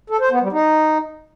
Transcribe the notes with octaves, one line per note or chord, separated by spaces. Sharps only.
A4
C5
B3
G3
D#4